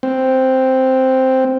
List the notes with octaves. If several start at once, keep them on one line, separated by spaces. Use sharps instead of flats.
C4